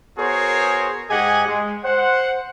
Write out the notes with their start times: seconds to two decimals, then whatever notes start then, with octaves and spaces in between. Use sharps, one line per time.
0.18 B3 F#4 G#4 A#4 C5 C#5
1.09 G#2 G4 G#4 D#5 F#5 G#5
1.47 G#3
1.84 C5 F#5